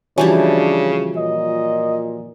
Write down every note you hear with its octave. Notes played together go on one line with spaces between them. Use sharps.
C#3 E3 F3 G3 D4 F#4 C#5 G#5
A#2 D#5